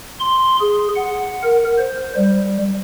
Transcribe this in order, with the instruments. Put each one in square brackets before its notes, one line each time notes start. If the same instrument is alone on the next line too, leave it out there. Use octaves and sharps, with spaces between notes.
[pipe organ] C6
G#4
F#5
A#4
C5
G3